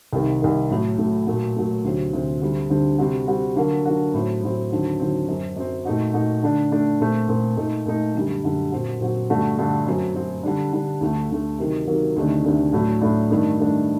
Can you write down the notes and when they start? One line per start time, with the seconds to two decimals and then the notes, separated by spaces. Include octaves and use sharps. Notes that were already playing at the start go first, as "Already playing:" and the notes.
0.13 C2 C3 D#3
0.42 C2 C3 D#3
0.70 A2 F#3 A3
0.98 A2 F#3 A3
1.27 A#2 F#3 A3
1.56 A#2 F#3 A3
1.84 D2 C3 F#3 C4
2.13 D2 C3 F#3 C4
2.41 D2 D3 G3 C4
2.70 D2 D3 G3 C4
2.99 C3 G3 C4 F#4
3.27 C3 G3 C4 F#4
3.56 D3 F#3 A#3 F#4
3.85 D3 F#3 A#3 F#4
4.14 A2 F#3 C4
4.43 A2 F#3 C4
4.71 D#2 D3 F#3 C4
5.00 D#2 D3 F#3 C4
5.28 F#2 F#3 C4
5.56 F#2 F#3 C4
5.85 A#2 A3 D#4 F#4
6.14 A#2 A3 D#4 F#4
6.43 D3 A3 D4
6.71 D3 A3 D4
7.00 A#2 A3 C4
7.28 A#2 A3 C4
7.57 A#2 A3 D#4
7.86 A#2 A3 D#4
8.14 F#2 D3 G3
8.44 F#2 D3 G3
8.72 A#2 F#3 C4 F#4
9.00 A#2 F#3 C4 F#4
9.30 G2 D3 A3 D4 F#4
9.58 G2 D3 A3 D4 F#4
9.87 F#2 F#3 C4
10.15 F#2 F#3 C4
10.43 D3 G3 D4
10.73 D3 G3 D4
11.01 D2 D3 A3
11.30 D2 D3 A3
11.59 C3 D#3 F#3 A#3
11.87 C3 D#3 F#3 A#3
12.16 D2 C3 D#3 A3 D4
12.45 D2 C3 D#3 A3 D4
12.73 A2 F#3 A3 D4
13.01 A2 F#3 A3 D4
13.30 G2 D#3 A3 D4
13.60 G2 D#3 A3 D4